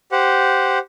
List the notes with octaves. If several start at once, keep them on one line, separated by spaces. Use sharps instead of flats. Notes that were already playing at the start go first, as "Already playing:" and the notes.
G4 C5 F#5